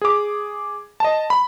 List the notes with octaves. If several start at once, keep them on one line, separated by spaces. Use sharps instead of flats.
G#4 D6
D#5 A5
B5